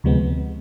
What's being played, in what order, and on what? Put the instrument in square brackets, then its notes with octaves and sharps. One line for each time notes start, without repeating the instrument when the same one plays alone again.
[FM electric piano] D2 C3 F3 G#3 B3